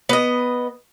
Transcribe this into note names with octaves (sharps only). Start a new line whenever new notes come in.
B3 D#5